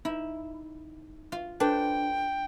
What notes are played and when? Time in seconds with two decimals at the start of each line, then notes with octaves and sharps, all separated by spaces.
0.05 D#4 E4
1.32 F4
1.60 D4 A4 B4 C5 G5